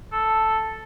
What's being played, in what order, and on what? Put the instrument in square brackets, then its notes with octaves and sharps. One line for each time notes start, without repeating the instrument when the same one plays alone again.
[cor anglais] A4